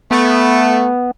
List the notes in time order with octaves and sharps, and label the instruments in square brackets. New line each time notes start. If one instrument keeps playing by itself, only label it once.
[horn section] A3 [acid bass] B3